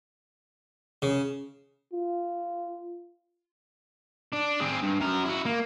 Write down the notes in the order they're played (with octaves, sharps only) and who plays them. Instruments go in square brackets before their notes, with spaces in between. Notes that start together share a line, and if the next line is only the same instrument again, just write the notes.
[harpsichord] C#3
[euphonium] F4
[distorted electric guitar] D4
C4 G#4
G2
F#2 A#4
E4 F#4
A#3